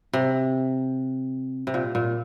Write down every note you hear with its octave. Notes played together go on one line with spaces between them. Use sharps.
C3
C3
A#2
A#2